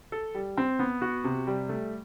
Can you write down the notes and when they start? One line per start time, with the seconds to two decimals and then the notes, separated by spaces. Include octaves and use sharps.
0.12 A4
0.35 G3
0.58 C4
0.79 B3
1.02 F#4
1.24 C3
1.47 G3
1.69 A3